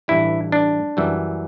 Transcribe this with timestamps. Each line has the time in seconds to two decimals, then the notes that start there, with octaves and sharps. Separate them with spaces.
0.08 A1 G2 E3 G3 E4
0.52 D4
0.97 F#2 E3 G3